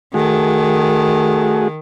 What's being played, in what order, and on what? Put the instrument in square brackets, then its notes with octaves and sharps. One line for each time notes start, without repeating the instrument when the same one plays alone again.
[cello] D#3 [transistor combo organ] A3 F#4 G#4